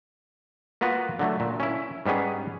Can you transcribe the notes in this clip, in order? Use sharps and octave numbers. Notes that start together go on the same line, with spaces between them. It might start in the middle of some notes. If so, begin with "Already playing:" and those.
A#3 B3 F4 F#4 B4
D3 F#3 A3
A#2
C#4 E4
G#2 G3 B3 C#4 G#4